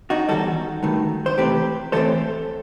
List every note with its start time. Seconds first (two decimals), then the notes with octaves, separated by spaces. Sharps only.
0.10 D#4 F#4
0.29 E2 D#3 G3 F#4 A4
0.83 G2 D#3 A3
1.26 C5
1.38 C3 E3 A3 C4 G4 B4
1.92 A2 E3 A3 C4 A4 C5